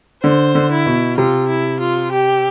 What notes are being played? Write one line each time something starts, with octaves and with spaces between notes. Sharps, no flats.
D3 C5
D3
E4
B2
C3 F4
E4
F4
G4